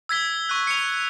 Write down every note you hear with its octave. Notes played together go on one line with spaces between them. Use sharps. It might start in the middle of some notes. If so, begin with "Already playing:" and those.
E6 G#6 B6 G7
C#6 F#6
C#7 F7